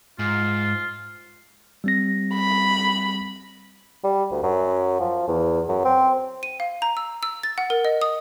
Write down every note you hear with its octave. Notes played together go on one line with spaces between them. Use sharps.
G#2 F4
G3 C4 A#6
B5
G3
D2
F#2
F3
E2
F#2
C4
D#7
F5
A#5
E6
E6
A6
F#5
A#4
D#5
D#6